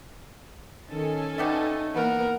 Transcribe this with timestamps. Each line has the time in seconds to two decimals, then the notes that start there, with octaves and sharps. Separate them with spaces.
0.90 D#3 C#4 A4 G#5
1.38 B2 G3 A3 D#4
1.95 E3 A#3 B3 A#4